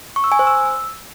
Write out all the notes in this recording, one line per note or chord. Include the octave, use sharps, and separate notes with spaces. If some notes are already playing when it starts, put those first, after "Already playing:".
C#6
E6
G#5
C5
E6